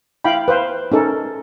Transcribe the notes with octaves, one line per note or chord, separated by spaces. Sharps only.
E4 F5 G5 B5
B4 C5 F5
C#4 D#4 A4 A#4